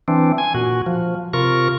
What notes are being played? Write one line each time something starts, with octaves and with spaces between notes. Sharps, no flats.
E3 C4 D4
G#5
A#2 F#4
F3
C3 F4 A#4 C#6